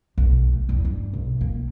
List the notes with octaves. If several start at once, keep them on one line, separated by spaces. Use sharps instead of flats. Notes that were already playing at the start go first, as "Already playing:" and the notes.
B1
A3
E2
G2
B1
A#3